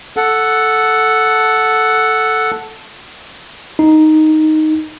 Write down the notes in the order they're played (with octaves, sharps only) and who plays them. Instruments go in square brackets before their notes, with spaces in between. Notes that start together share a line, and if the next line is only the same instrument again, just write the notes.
[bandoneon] A4 F#5
[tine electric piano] D#4